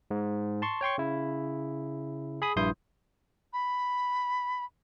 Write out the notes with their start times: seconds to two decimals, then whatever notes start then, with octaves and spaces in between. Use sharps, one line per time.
0.11 G#2
0.62 A5 C6 C#6
0.81 C#5 G5 C6 C#6
0.98 C#3 E4
2.42 G#4 B5 D#6
2.56 A#1 G2 E4 C6 D#6 G6
3.53 B5